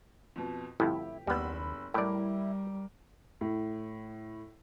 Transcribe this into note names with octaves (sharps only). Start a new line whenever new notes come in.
F2 B2
G1 F2 A2 E4 G4
F#1 D#2 G3 B3 B5 E6
A2 G3 E4 A#4 D5
A2